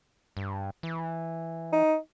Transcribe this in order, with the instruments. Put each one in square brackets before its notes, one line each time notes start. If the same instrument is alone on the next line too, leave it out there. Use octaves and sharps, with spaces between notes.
[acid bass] G2
E3
[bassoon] D#4